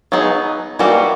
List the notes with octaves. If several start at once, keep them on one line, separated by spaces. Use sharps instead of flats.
F#3 B3 D#4 G#4
E3 G3 A#3 D#4 F#4